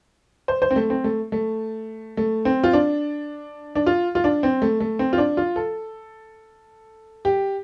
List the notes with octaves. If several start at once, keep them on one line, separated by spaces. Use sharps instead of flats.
C5
C5
C4
A3
C4
A3
A3
A3
C4
F4
D4
D4
F4
F4
D4
C4
A3
A3
C4
F4
D4
F4
A4
G4